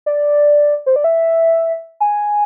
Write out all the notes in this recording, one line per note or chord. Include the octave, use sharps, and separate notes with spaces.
D5
C5
D5
E5
G#5